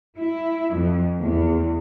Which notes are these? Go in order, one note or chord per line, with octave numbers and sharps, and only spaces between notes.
E4
F2
E2